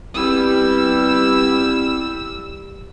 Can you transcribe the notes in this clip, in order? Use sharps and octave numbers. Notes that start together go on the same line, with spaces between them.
G3 B3 C4 E4 E6